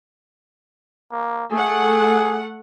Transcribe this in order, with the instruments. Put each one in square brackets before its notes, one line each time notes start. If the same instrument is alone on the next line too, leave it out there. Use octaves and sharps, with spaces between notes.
[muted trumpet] A#3
[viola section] A3 F#5 [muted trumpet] G#4